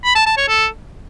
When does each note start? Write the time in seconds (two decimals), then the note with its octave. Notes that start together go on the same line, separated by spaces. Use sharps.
0.04 B5
0.15 A5
0.26 A5
0.37 C#5
0.48 A4